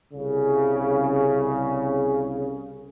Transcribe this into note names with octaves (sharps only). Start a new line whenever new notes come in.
C2 C#3